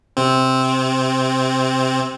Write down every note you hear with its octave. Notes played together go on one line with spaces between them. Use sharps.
C3 C4